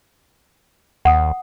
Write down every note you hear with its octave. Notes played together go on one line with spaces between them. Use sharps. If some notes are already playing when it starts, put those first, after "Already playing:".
D#2 F#5 D#6